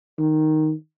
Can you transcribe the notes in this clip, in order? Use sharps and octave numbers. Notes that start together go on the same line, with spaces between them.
D#3